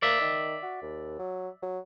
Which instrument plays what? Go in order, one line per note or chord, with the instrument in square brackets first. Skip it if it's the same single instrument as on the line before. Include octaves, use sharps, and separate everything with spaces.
[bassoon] A#3 [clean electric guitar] D5 E5
[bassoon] D#3
F#4
D#2
F#3
F#3